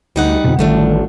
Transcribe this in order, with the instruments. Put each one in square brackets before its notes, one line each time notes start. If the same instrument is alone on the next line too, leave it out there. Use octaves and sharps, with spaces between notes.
[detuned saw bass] D2 [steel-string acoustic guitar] G3 D#4 F#5
[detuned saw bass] F2 [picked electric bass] B2 D3
[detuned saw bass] A1 [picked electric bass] D3 D#3 G3 [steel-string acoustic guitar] F3 A3 D4